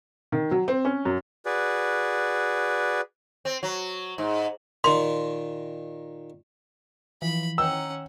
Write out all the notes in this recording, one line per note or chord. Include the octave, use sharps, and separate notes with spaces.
D#3
F#3
C4
C#4
F#2
F#4 G#4 B4 D5
C4
F#3
G#2
A#2 D#3 C6
E3 F3 B5
D#3 C#4 F#5 G5 A#5 E6